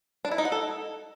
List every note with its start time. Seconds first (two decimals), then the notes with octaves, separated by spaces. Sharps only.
0.25 D4
0.31 E4
0.38 D#4
0.45 F#5
0.52 A4